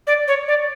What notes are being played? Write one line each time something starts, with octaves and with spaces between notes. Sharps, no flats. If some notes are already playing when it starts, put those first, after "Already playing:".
D5
C#5
D5